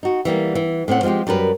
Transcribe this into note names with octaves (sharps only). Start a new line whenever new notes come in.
D#4 F#4
E3 G3 A#3 B3
E3
A2 C4 C#4 F#5
F3 G#3 C4 F4 G4
F#2 G3 A#4 B4